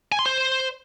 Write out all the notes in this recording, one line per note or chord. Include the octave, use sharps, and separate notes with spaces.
G#5
C6
C5